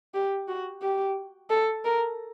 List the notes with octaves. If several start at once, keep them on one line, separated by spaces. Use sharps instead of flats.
G4
F#4
G4
A4
A#4